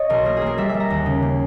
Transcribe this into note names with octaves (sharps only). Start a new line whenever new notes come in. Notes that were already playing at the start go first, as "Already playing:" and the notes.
Already playing: C#5 D#5
B1 A#4
A#3 A#4
A#3 G#4
A#4
G3 E5
G3 E5
A#5
D#2
C#3
A#3